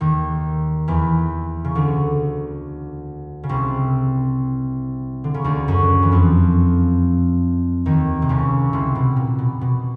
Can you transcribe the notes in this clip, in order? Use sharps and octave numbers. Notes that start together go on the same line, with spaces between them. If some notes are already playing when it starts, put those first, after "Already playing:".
D#2 D#3
E2 E3
C#3
D2 D3
C#3
C2 C3
D3
C#3
D2 D3
F#2 F#3
E3
F2 F3
D#2 D#3
C3
C#2 C#3
C2 C3
B2
A#2
B2
B2